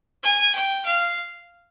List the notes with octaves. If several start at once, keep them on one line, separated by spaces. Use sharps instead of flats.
G#5
G5
F5